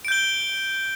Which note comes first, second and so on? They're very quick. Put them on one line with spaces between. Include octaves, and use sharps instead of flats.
D7 G6 G7